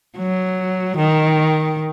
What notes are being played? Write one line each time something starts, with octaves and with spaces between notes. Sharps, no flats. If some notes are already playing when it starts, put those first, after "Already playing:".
F#3
D#3